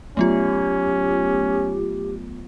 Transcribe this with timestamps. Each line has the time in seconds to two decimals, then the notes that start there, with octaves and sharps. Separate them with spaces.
0.17 F#3 A3 B3 C#4 F4 G4